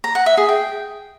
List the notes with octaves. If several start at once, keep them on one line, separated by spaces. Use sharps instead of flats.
A#5
F#5
E5
G#4
G5